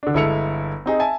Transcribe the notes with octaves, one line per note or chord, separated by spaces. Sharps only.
D3 D4
G1 G#3 E4 A4 C#7 F7
C4 D#4 G#4
E5 G#5 A5